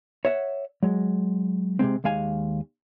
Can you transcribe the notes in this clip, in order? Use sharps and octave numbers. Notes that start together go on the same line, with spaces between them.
C#5 E5 F#5
F#3 G#3
C3 E3 G#3 C4
D#2 G#3 F5 G#5